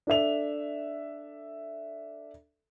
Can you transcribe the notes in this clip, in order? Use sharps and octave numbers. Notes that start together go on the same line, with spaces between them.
D4 A4 E5 F7